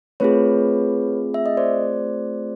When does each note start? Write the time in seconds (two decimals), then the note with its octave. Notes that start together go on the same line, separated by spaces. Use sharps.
0.20 A3 C4 F4 G#4 B4 C#5
1.34 E5
1.46 D#5
1.57 C5 D5